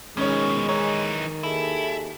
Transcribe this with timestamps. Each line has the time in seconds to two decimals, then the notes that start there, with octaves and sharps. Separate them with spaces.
0.17 B2 D#3 F3 G#3 C#4 C#5
0.69 E3 D#4 C#5
1.43 D#2 E4 G#4 A4